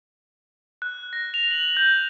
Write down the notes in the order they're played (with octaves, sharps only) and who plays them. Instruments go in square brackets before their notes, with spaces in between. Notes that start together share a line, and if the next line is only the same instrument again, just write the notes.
[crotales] F#6
A#6
F7
F#7
G6